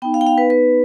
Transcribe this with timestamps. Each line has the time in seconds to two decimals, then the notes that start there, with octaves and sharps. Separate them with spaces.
0.02 B3 D#4 G5
0.14 F5
0.21 G5
0.27 F5
0.38 B4
0.50 B4